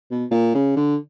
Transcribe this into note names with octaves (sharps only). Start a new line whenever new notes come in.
B2
A#2
C#3
D3